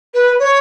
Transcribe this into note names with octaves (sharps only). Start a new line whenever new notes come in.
B4
C#5